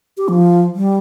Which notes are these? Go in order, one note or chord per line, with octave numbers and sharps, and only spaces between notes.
G4
F3
G3